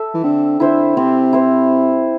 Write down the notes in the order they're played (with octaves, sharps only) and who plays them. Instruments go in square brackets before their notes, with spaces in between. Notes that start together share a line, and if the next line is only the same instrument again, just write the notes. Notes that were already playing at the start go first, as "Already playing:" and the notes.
Already playing: [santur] A4 E5
[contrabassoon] E3
[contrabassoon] D3 [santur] C4
[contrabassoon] D3 [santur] E4 C5 E5
[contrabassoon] C3 [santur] C4
[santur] E4 C5